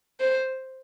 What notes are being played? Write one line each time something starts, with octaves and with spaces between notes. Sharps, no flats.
C5